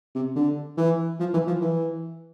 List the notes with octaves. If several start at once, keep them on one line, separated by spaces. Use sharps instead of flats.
C3
D3
E3
F3
E3
F3
E3